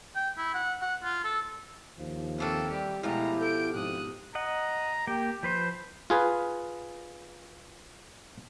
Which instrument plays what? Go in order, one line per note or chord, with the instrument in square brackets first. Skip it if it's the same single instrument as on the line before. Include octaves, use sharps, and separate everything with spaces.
[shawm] G5
E4
F#5
F#5
F4
A4
[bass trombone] D#2 [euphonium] F3
[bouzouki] D#3 E3 A3 [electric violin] C4 A4
[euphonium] G3 [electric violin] G4
[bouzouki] B2 F3 G4 [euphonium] G#3 [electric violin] A3 A#5 [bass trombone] E4
[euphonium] A4 [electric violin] G6 D7
[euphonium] F2 [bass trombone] G#2 [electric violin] D#6 F#6
[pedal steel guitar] D#5 F#5 [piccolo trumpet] A#5
[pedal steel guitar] A#3 G5 [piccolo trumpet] G4
[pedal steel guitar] F3 B4 C5 [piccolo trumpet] G6
[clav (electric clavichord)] F4 G#4 B4